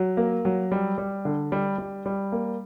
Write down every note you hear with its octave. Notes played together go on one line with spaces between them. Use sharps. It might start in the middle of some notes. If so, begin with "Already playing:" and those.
Already playing: F#3
A#3
F#3
G3
G3
D3
G3
G3
G3
A#3